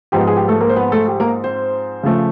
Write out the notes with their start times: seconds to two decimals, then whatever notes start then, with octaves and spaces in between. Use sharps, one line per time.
0.12 G#2 F3 G#3 B3 D#4 G4
0.27 G#4
0.36 G4
0.48 A3 A4
0.60 A#3 A#4
0.69 C5
0.76 B3 B4
0.92 A3 A4
1.08 G4
1.20 A#3 A#4
1.44 C4 C5
2.03 C#3 F3 A3